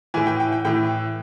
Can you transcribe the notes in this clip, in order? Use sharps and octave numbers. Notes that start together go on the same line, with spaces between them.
A2 E3 G#5
G5
G5
G5
A2 E3 G5